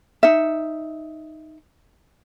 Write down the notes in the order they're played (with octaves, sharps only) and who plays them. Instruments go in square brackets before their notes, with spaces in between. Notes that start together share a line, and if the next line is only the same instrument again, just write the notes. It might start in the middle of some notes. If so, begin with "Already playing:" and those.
[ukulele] D#4 E5